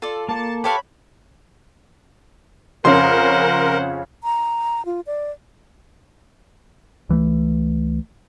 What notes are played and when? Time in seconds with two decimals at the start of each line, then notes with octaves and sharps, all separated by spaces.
0.02 F4 A4 D5
0.29 A#3 A4 A5
0.64 G4 A4 B4 C#5 F5 B5 C#6
2.85 F2 C#3 C#4 A#4 C5 F#5 C6
4.22 A#5
4.86 F4
5.07 D5
7.09 C#2 E3 F3 A3